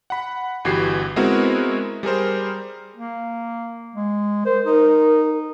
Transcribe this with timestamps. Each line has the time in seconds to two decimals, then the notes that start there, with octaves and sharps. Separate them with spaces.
0.10 F#5 B5
0.65 G1 E3 F#4 G4 C7
1.16 G#3 B3 C4 E4 F#4 A#4
2.03 G3 G#4 A#4 C5
2.96 A#3
3.96 G#3
4.45 A#4 C5
4.66 D#4 A#4